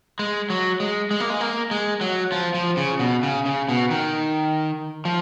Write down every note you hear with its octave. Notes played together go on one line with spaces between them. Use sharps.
G#3
F#3
G#3
G#3
A#3
G#3
A#3
G#3
F#3
F3
F3
C#3
B2
C#3
C#3
B2
D#3
F3